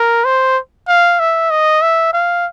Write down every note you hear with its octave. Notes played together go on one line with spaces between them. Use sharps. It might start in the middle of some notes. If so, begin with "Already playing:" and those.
Already playing: A#4
C5
F5
E5
D#5
E5
F5